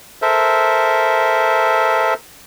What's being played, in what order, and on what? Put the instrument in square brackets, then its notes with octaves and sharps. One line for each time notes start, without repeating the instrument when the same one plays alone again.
[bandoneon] A4 A#4 C5 E5